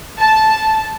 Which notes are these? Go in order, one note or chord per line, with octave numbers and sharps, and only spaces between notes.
A5